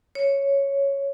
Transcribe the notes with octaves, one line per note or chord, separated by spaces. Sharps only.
C#5